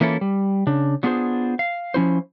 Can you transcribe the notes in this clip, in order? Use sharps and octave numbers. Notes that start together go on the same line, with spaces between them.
E3 A#3 C#4 E4 F4 A4
G3
C#3 D4
F#3 B3 D4 F4 G#4 C5
F5
F3 C#4 E4 C5